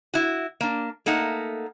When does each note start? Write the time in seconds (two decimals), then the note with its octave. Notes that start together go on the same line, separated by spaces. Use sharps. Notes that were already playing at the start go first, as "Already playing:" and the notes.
0.14 E4 F#4
0.61 A#3 D4
1.06 A3 A#3 D#4 F#5